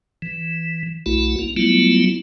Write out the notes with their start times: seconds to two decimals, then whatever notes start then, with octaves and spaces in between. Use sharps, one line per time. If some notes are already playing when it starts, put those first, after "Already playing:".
0.22 E3
1.06 B1 A3 E4 F#4
1.39 A#3
1.56 F#3 G3 A3 B3 E4 F4